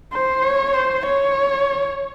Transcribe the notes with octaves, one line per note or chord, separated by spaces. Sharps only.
C5
C#5
C5
C#5